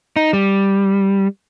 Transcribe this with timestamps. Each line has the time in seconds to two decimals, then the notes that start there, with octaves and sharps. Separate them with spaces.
0.16 D#4
0.33 G3